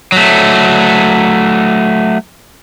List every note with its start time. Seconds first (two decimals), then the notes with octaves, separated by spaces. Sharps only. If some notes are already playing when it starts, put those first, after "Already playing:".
0.12 F#3 A3